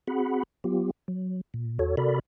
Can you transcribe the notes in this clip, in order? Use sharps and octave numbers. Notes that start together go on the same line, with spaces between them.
C4 F#4 G#4 F#5 B5
F#3 B3 F4 G4
F#3
A#2
E2 F#4 A4 C#5
C3 F#4 A4 A#4 D5 B5